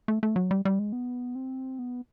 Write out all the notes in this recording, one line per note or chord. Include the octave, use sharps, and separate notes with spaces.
A3
A3
F#3
G3
G3
G#3
B3
C4
B3